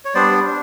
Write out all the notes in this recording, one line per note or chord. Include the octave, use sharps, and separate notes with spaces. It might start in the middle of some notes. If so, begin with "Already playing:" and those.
C#5
G3 B3 D4 C5 D5
D4